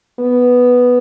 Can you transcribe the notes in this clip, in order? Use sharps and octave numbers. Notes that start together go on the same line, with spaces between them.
B3